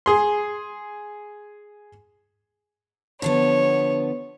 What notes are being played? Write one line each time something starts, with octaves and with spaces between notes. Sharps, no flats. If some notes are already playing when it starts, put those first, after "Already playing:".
G#4 C6
D3 F3 B3 C#5